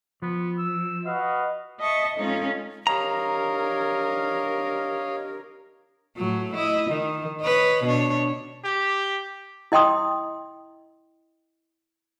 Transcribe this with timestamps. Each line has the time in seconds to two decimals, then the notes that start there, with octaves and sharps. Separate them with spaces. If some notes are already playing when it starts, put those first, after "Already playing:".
0.22 F3 B3
0.58 E6
1.06 F#4 B4 D#5 F5
1.80 D#5 E5 A5 C#6
2.16 G#3 C#4 D#4 F4 A4
2.87 D4 G4 A#4 C#5 D#5 F5 A#5
6.16 A2 F#3
6.55 E4 D#5
6.90 D#3
7.41 B4 C#5 D#5
7.84 B2 D4 C#5
8.64 G4
9.72 E4 D#5 G5 C6 D#6